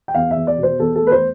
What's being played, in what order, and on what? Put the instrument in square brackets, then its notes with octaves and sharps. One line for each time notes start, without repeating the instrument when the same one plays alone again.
[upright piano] G5
E2 F5
E5
E2
D5
B2
C5
E2 A4
A4
A3
B4
C5